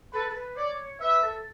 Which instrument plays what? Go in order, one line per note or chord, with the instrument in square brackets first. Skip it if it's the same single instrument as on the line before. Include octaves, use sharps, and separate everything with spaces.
[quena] A4 [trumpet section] B4
[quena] A4
B4
[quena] C#5 [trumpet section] D5
[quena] B4 [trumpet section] E5
[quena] A4